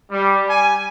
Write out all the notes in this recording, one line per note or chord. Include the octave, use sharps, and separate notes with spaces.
G3
G#5